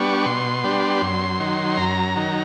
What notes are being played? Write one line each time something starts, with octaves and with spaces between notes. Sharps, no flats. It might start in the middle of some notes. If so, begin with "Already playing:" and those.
Already playing: G3 B3 D4 C#6
B2 C6
G3 B3 D4
F#2
D#3 F#3
F#2 A#5
D#3 F#3